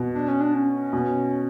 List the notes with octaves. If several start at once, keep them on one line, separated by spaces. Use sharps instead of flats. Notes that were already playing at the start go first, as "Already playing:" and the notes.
Already playing: B2
D4
C#4
D4
C#4
B2